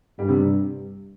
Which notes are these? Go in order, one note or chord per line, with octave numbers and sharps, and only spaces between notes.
G2 G3
C3